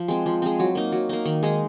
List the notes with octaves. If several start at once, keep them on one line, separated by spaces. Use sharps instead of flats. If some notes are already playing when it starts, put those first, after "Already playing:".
Already playing: F3
G#3 C4
F3
G#3 C4
F#3
A#3 D#4
F#3
A#3 D#4
D#3
G#3 D#4